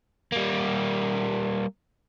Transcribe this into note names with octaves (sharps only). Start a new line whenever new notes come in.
G3 A#3